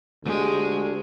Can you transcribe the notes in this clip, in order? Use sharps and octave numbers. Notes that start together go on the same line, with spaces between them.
D2 G#3 G4